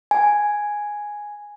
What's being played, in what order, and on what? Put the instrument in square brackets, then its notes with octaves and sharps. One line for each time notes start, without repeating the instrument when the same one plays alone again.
[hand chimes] G#5